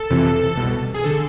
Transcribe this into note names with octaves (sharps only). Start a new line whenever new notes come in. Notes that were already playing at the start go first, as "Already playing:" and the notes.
Already playing: A4
F2 C3 E3
C2 B2
G#4
D3 A4